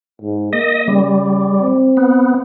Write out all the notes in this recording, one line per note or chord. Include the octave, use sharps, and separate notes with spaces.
G#2
A#3 D#5
C#3 G3
C4
B3